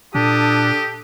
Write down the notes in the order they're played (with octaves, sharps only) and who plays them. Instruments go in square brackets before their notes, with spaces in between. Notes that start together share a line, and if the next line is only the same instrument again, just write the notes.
[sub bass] A#2 [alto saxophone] D4 [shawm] G4 [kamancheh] A4 D#6